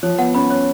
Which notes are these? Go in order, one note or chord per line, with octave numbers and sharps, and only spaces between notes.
F3 C#5
B3 F#5
C#4 B5
C#5